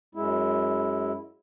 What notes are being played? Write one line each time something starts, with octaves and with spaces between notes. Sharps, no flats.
F#2 G#3 E4